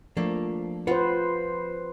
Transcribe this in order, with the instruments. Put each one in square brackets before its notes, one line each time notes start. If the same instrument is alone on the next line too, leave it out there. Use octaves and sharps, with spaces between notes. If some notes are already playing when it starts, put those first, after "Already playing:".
[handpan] F3 [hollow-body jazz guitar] A3 A#3 D4
[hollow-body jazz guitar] F4 F#5 [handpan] B4 C5